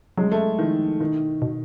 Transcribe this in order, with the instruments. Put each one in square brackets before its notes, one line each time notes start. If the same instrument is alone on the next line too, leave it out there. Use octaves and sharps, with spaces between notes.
[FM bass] F#3 [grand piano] G#3
[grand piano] A3
[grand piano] D#3 [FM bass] F3
[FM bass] B2 [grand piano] D#3
[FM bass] B2